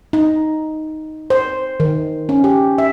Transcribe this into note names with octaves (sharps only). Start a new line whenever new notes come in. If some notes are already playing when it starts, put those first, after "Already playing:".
D#4
C5
D#3
C#4
G4
E5